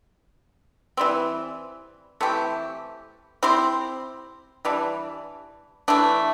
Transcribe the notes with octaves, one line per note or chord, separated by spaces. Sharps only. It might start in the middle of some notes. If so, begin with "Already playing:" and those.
E3 G3 C4
E3 A3 C4 G4
C4 E4 G4 C5
E3 G3 D4
E3 A3 D4